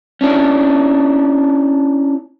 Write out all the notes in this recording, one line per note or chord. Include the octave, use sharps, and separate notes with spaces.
C#4 D4 E4